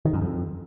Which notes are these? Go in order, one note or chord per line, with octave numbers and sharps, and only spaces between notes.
D#3
F#2
F2